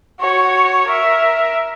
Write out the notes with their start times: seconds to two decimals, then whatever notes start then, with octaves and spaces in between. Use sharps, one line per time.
0.20 F#4 C#5
0.88 A#4 E5